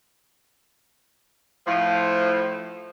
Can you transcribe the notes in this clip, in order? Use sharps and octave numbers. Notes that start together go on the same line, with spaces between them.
A2 F3